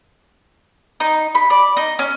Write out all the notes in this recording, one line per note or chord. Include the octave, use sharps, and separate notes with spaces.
D#4
B5
D5
D#4
C#4